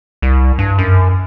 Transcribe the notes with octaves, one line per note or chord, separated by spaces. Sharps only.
C2
G2
F#2